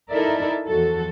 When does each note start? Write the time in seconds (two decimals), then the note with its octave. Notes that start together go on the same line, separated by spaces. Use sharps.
0.10 D#4 E4 A4 A#4 D5 E5
0.67 E2 F3 F#4 A4